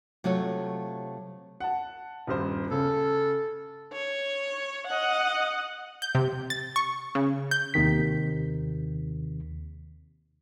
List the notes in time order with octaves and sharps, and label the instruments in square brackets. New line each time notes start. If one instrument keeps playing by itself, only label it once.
[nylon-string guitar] C3 F#3 A3 F4 C#5
[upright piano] F#5 A5
D#1 G2 C5
[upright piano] C#3 [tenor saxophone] A4
[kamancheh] C#5
D#5 F#5
[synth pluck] G6
C3
A6
C#6
C#3
G6
[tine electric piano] D#2 C3 D#3 B6